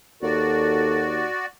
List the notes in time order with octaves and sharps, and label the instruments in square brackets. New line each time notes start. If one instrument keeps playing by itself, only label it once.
[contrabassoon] D#2 [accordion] F#4 D5 [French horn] A4